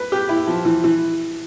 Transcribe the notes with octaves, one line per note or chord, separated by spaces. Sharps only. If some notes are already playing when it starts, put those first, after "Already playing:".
Already playing: B4
G4
E4
F3
E3
E3